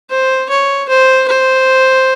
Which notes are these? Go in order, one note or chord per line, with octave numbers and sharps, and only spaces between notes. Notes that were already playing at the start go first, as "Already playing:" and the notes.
C5
C#5
C5
C5